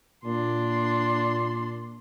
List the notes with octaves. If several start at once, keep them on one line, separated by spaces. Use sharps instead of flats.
A#2 D4 C6